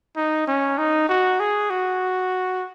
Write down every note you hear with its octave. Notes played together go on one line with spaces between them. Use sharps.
D#4
C#4
D#4
F#4
G#4
F#4